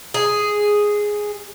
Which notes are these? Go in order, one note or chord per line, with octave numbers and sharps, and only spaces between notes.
G#4